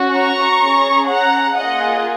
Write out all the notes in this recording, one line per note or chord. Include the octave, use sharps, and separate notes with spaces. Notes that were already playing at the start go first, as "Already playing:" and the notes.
Already playing: C#4 F#4
A#5 C#6
C#4 G#4
F#5 A#5
A#3 F4 G#4 D#5 F#5